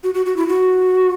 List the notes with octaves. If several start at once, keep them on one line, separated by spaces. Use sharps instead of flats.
F#4
F#4
F#4
E4
F#4